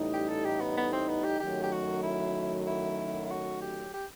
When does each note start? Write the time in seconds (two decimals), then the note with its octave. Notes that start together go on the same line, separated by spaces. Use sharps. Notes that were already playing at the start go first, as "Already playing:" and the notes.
Already playing: A1 A2 G3 D#4
0.14 G4
0.29 A4
0.45 G4
0.61 B3
0.77 B3
0.92 C4
1.08 B3
1.24 G4
1.40 F#2 D#3 F#3 A3 G4
1.63 G4
1.72 F#4
2.03 E4
2.67 E4
3.25 E4
3.31 F#4
3.62 G4
3.94 G4